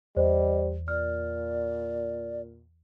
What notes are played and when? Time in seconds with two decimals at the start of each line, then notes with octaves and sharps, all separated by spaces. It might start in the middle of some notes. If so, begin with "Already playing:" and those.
0.17 E2 G3 C5 D5 D#5
0.88 A#2 D5 F6